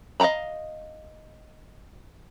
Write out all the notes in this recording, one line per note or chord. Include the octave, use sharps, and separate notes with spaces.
D#5 F5 G5 A#5 B5